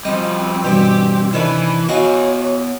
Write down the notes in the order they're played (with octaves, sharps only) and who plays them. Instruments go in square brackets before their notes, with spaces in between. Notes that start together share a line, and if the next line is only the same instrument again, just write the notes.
[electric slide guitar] F3 G3 [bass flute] C4 [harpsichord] D#5
[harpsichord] G2 B2 E3 [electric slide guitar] G4
[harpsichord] C3 D#3 D4 [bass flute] E3 [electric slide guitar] E4 B4
[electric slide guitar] B3 G#5 [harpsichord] F#4 D#5 F5 [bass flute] C#5